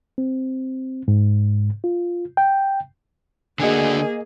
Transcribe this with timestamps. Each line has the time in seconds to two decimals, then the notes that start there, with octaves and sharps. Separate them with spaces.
0.18 C4
1.08 G#2
1.84 F4
2.37 G5
3.60 D3 A#3 D4 F#4 G#4 D#5 G#5